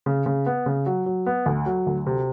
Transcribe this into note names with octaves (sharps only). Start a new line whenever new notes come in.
C#3
C#3
B3
C#3
F#3
F#3
B3
D2
F#3
D2
C3